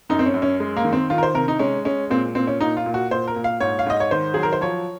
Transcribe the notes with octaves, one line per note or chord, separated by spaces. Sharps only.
F#2 D#4
C4
C#4
F#2
C#4
G#3
A#3
D#3
C4
D#3 F4
A#4
C5
C3 A#4
D#4
G#3 C#4
G#3 C#4
A#2 C4
A#2 C4
C#4
A#2 D#4
F4
A#2
F#4
A#2 C5
A#4
A#2
F5
G#2 C#5
F5
G#2 D#5
C#5
D#3 C5
F#3 G#4
A#4
C5
F3 C#5